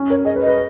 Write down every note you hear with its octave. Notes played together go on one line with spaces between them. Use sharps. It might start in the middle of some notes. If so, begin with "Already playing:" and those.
Already playing: C#4
A#4 C#5
G#4 D#5
B4
D#5
B4